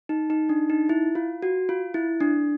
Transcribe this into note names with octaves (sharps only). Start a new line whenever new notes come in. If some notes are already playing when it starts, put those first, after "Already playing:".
D#4
D#4
D4
D#4
E4
F4
F#4
F4
E4
D4